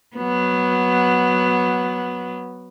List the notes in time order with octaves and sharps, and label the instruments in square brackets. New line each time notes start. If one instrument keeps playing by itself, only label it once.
[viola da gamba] F#3 B3